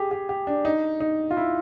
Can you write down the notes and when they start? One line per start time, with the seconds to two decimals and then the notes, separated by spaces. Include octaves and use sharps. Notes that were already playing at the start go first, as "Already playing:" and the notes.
Already playing: G4 G#4
0.11 G4
0.29 G4
0.47 D4
0.65 D#4
1.00 D#4
1.31 F4
1.37 E4